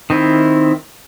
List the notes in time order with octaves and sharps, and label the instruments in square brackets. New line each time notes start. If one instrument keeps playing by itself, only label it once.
[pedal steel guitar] D#3 C4 E4